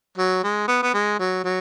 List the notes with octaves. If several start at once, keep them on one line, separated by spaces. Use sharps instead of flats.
F#3
G#3
B3
B3
G#3
F#3
F#3